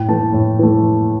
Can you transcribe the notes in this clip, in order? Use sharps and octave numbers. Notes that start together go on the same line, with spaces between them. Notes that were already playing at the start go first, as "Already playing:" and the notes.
Already playing: A2 G5
E3 A3 A5
A2
E3 A3